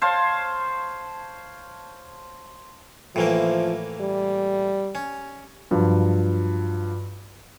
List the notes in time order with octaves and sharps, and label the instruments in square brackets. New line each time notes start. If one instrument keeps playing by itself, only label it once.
[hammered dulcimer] C5 C#5 F5 A5
[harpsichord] A2 E3 A#3 [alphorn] F3
[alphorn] G3
[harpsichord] C#4
[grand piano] G2 F3 F#3